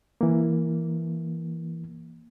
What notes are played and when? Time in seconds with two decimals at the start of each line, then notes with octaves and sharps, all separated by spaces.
0.21 E3 A#3